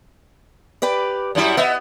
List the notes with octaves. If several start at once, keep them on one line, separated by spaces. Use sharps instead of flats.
G4 B4 D5
F#2 G3 E4
B3 D#5 E5